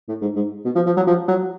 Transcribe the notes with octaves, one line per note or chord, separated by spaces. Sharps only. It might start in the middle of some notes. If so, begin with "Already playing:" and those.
A2
G#2
G#2
B2
F3
F3
F#3
F3
F#3